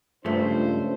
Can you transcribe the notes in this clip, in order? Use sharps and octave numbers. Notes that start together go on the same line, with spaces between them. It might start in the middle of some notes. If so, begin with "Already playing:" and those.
C#2 G2 F3 A3 D4 C5